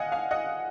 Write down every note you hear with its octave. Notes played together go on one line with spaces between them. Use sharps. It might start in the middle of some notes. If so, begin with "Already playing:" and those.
Already playing: D#5 F5 F#5 G#5
F5 G#5
D#5 F#5